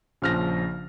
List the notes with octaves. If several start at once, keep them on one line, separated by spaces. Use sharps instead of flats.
A#1 C#3 F3 C#4 F6 A#6